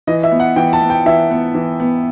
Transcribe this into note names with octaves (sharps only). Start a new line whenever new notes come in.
E3 D#5
E5
B3
F#5
E3 G5
A5
B3
G5
E3 E5
B3
E3
B3